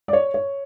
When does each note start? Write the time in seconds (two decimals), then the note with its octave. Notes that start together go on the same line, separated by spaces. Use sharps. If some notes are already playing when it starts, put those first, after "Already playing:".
0.08 D5
0.13 C#5
0.34 C#5